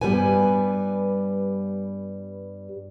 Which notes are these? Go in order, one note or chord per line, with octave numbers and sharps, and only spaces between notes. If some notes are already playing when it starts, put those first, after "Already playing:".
G2 G3 B3 B4 G#5